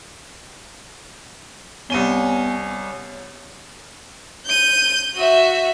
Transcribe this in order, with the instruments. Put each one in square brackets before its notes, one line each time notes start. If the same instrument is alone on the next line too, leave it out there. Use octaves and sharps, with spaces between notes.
[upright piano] C2 D#7 G7 [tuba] B3 [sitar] C#4
[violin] G6 D#7
F#4 E5